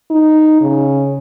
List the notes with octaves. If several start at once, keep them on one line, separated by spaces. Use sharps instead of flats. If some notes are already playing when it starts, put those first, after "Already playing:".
D#4
C#3